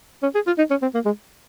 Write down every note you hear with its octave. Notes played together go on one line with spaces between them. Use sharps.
C#4
G#4
F4
D#4
C#4
C4
A#3
G#3